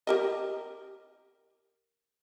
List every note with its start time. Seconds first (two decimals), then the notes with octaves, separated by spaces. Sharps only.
0.07 G4 A#4 D#5